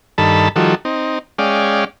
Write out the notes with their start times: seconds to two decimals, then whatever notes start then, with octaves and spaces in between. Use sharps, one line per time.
0.18 G2 D#3 A4 A5 B5
0.56 D#3 F3 G3 F#4 A4
0.85 C4 D#4
1.39 G#3 C#4 D5 F5 G5